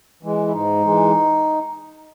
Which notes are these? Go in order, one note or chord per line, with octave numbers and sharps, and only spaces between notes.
E3 G#3
E4
G#2 D#4
E3 G#3